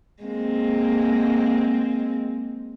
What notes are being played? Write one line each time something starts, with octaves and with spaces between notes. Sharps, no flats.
G#3 A#3 C4